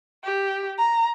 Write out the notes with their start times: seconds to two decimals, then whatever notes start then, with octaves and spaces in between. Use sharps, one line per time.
0.24 G4
0.78 A#5